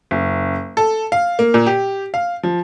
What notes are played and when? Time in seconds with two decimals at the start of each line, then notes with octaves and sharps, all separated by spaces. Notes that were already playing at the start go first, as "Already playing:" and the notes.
0.11 F#1
0.77 A4
1.12 F5
1.39 A#3
1.54 A#2
1.66 G4
2.14 F5
2.43 F3